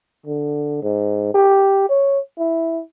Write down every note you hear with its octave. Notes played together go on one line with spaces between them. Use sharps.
D3
G#2
G4
C#5
E4